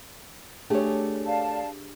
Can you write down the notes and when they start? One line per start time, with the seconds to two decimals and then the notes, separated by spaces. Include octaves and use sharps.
0.70 A3 D4 G4 G#4 C#5
1.26 D5 F5 A5